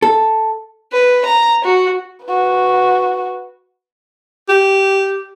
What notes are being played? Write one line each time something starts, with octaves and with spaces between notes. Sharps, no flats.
A4
B4
A#5
F#4
F#4 B4
G4